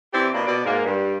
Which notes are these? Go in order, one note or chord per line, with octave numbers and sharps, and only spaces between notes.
E3 C4 E4 G4 C5 D5
B2 A#3 D4
B2 D5
G#2 A#3
G2